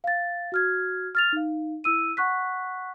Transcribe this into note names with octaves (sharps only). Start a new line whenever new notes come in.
F5 A6
F#4 F6 G#6
F6 A6 F7
D#4 F5
E4 E6 D#7
F#5 C#6 F#6 B6